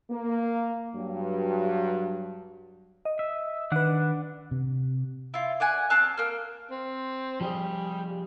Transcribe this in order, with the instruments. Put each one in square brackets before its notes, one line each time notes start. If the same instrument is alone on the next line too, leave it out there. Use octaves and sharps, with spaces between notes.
[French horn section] A#3
G2 F#3
[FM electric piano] D#5
[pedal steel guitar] E5
[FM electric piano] D#3 B4 [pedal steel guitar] D4 F#5 F#6
[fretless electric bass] C3
[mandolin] E4 F4
D5 F#5 G#5
C4 A5 F6 F#6
A#3 F6
[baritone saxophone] C4
[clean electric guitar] F3 G4 G#4 [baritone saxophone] G3